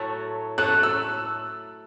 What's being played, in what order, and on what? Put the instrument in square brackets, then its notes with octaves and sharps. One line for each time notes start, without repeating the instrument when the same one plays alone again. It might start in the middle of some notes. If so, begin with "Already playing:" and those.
Already playing: [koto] A2 F#3 A3
[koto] A2 F#3 A3 [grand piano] F#6
[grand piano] E6